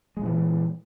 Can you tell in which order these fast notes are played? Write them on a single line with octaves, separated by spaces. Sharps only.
G#3 A#2 E3